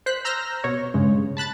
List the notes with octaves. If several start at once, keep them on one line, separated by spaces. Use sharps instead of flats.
C5 F#6 B6
A#5 E6 F6 G6 A#6
B2 C#5
G2 C#3 G#3
A5 B5 F#6 A6